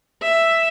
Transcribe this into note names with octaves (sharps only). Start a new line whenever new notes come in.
E5